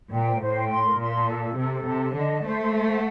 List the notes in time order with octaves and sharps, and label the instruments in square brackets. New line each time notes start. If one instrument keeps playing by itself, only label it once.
[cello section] A#2 [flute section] G5
[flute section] C5
[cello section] A2 [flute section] C5
[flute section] G5
C6
A#4
[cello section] A#2 [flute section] C6
[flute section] A5
A4
A4
[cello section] C3 [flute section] A4
[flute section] A4
[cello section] C3 [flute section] A5
[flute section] A5
[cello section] D3 [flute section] D#5
[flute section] A5
[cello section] A3 [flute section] C5
[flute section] C5
C5
F#5